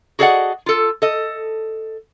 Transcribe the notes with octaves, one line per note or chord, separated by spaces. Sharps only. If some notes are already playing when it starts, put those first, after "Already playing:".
F#4 G#4 A4 D5 D#5 F#5
F4 A4
A4 D#5